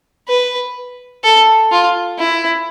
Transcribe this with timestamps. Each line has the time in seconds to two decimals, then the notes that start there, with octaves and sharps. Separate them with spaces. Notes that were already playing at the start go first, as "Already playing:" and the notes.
0.28 B4
1.24 A4
1.71 F4
2.18 E4